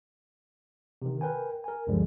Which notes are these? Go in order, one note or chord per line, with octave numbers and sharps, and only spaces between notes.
C3 D#3
A#4 B4 G5 G#5
A#4 G#5
D2 G2 D3 F3 G3 G#3